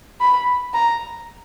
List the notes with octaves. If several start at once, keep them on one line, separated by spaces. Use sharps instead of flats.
B5
A#5